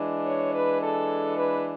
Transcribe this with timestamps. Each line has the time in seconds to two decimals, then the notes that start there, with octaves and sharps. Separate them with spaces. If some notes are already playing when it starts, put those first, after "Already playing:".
Already playing: E3 G#3 D4
0.25 C#5
0.53 B4
0.81 A4
1.37 B4